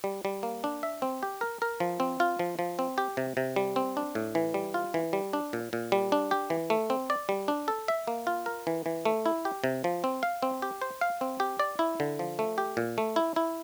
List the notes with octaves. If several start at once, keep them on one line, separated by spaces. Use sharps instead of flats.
G3
G3
A#3
D4
E5
C4
G4
A#4
A#4
F3
C4
F4
F3
F3
C4
G4
C3
C3
G3
C4
D4
A2
E3
G3
F4
E3
G3
D4
A#2
A#2
G3
D4
G4
E3
A3
C4
D5
G3
D4
A4
E5
A#3
F4
A#4
E3
E3
A3
E4
G4
C3
F3
C4
F5
C4
G4
C5
F5
C4
G4
D5
E4
D3
F3
A3
G4
A#2
A3
E4
E4